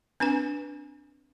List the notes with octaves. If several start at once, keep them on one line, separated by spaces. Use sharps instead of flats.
C4 D4 B4 G#5